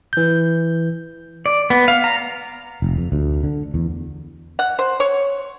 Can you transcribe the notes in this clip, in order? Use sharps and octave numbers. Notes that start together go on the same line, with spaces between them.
E3 G6
D5
B3
F5
A#5
F1
F2
D2
D3
E2
F#5
C5
C#5